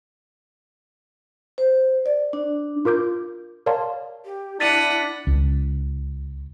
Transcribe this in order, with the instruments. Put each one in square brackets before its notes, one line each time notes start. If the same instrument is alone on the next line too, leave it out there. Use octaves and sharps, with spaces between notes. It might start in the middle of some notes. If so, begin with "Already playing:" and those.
[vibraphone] C5
D5
D4
[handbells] F4 A#4 D6 G6
A#4 C#5 D5 F5 A5 C6
[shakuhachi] G4
[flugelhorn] D4 [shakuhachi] E4 [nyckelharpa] F#5 [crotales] A6 B6 D#7
[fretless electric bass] C#2